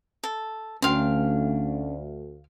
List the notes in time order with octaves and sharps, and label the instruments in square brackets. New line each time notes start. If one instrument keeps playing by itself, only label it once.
[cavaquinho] A4
[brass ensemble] D2 [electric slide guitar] C#4 D4 G5 [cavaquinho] F5 C6